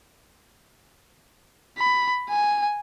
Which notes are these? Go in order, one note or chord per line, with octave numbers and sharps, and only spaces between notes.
B5
G#5